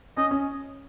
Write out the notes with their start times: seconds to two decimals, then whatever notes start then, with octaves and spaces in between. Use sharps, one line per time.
0.17 C#4 D#5
0.31 C#4